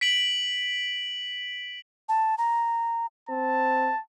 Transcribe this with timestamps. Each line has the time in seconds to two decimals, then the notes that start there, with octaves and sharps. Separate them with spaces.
0.01 B6 D7 F#7
2.09 A5
2.38 A#5
3.29 C4 A5